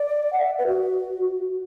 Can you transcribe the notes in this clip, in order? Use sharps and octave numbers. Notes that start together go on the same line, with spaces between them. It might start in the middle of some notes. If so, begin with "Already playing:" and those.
Already playing: D5
F#5
E5
B4
F#4